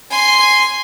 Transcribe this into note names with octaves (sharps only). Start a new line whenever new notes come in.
G#5 C6